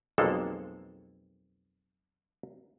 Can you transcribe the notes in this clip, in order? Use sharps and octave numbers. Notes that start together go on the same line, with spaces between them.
B1 F2 G#3 A#3 A4